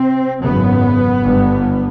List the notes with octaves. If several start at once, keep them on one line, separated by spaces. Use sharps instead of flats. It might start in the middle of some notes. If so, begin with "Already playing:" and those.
Already playing: C3 C4
G#1 F#2 C#3 B3
G1 G2